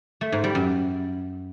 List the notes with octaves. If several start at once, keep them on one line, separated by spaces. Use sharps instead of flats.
A3
G#2
G3
F#2